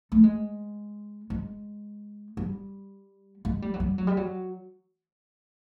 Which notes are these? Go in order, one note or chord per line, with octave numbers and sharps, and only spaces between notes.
A3
G#3
G#3
G3
G#3
G3
F#3
G3
F#3
G3
F#3